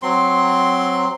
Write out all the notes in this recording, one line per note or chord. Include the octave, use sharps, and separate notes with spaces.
F#3 C4 C6